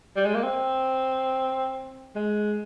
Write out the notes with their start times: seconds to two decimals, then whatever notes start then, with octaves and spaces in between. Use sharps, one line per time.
0.17 G3
0.26 G#3
0.35 A#3
0.43 C4
2.16 G#3